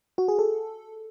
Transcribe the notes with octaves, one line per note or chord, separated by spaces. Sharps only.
F#4
G#4
A4